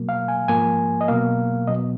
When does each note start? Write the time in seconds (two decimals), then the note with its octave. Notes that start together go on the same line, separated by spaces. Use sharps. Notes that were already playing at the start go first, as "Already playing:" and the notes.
Already playing: B2 F#3 A#3
0.09 F5
0.28 G#5
0.48 G#2 F3 A#3 G#5
1.01 D#5
1.08 B2 F#3 A#3 F5
1.67 B2 F#3 B3 D#5